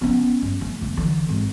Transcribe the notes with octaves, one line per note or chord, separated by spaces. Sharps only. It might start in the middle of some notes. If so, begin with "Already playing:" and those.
B3 C#4
G1
A3
E1 C#3
D3 E3
G#1